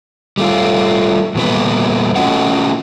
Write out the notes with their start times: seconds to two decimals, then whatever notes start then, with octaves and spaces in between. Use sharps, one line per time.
0.38 G3 A3 F4
1.35 E2 A#2 G3 B3 B4
2.16 A3 C#4 F4 F#4 D#5 F#5